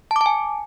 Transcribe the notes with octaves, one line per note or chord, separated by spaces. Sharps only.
A5
D6
A5
G#5